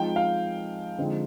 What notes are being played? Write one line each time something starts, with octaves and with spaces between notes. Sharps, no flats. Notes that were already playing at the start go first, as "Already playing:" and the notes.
Already playing: F3 G#3 C4 D#4 G5
F5
D3 F3 G#3 C4 D#4